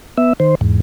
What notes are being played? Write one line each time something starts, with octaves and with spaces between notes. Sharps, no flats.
B3 E5
D#3 C5
E2 G#2